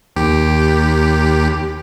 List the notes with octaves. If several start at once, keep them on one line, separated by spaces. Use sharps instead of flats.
D#2 G4